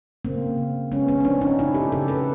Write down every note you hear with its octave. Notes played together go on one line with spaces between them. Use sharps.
C#3 A#3 C4
C#3
G#3 B3 C#4
B3 C#4
C#4
F3 C4 D4
C#4 D#4
C#3 D4 E4
G4 A4
C#3 G4 A4
A4 B4